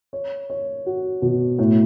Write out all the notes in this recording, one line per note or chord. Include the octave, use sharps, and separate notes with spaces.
C#5
C#5
F#4
B2
A2